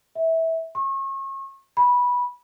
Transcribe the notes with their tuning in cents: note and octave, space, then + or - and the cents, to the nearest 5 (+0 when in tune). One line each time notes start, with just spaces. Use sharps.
E5 -20
C#6 -35
B5 -15